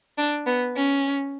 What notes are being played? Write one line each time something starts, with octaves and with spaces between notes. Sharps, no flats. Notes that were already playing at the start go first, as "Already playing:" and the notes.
D4
B3
C#4